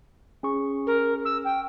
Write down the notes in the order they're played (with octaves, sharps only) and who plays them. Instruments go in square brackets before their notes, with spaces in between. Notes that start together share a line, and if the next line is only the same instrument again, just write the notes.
[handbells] C#4 G#4 C#6
[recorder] A#4
E6
G5